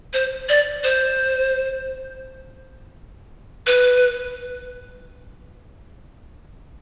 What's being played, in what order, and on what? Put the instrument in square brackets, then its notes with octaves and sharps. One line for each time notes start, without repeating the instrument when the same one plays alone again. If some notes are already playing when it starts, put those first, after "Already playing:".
[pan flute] C5
D5
C5
B4